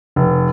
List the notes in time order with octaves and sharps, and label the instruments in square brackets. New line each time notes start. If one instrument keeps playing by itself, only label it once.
[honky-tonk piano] F1